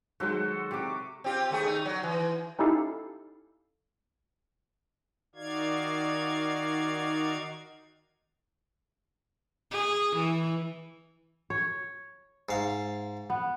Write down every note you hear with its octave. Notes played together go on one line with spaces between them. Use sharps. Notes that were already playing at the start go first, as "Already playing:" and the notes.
D#3 F#3 G#3 F#4 A4 C5
C3 E4 G4 D6
C4 F4 G4
D#2 A3 G#4
D#4
F#3
E3
C#4 D#4 E4 G4 A4 F5
D#3 D#4 F#4 D5 F5 G#6
G#4
E3
C#5
G#2 F5
B3